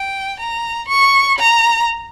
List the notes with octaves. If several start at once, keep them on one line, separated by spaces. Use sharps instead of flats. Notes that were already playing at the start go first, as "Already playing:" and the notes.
Already playing: G5
A#5
C#6
A#5